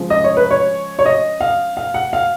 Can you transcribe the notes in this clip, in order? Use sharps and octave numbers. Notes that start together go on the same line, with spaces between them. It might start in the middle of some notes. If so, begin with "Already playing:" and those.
Already playing: C#3 F3 G#3
D#5
C#5
B4
C#5
C#5
D#5
F5
F5
F#5
F5